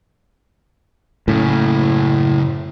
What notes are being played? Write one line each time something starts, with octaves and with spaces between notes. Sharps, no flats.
F#2 A2 C#3